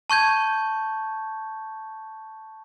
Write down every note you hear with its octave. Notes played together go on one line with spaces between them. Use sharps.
A5 C#6 G6 G#6